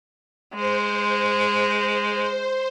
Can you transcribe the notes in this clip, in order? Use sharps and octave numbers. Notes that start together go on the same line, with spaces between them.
G#3 C5